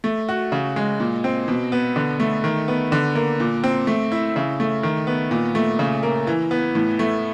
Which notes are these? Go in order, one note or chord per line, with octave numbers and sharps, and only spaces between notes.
A3
F#4
C#3
G#3
A#2
C4
B2
B3
D3
A3
D#3
B3
D3
A#3
A#2
C4
A3
E4
C#3
A3
D#3
B3
A#2
A3
C#3
A#3
E3
B3
A2
A3